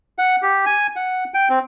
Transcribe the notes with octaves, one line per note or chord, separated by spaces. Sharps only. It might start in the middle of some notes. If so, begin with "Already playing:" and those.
F#5
G4
G#5
F#5
G5
C4